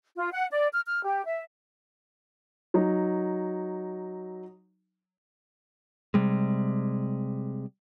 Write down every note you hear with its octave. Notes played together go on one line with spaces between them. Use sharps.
F4
F#5
D5
F6
F6
G4
E5
F#3 D#4
C3 G3 G#3